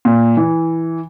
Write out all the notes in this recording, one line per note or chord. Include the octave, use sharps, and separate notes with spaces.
A#2
E3